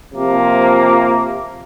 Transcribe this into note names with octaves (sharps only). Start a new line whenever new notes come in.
C3 F3 A#3